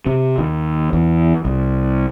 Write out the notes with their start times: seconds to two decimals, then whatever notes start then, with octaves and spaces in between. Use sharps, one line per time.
0.06 C3
0.38 D#2
0.93 E2
1.45 C2